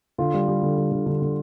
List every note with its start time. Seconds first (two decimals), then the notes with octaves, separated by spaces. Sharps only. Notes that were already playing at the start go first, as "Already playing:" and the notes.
0.18 D3 F4
0.34 G3
0.48 G3
0.63 D3
0.78 G3
0.92 D3
1.06 D3
1.22 D3